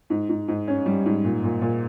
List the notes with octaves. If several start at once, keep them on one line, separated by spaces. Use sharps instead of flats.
G#2
G#2
G#2
C#4
G3
G#2
A#2
A#2
A#2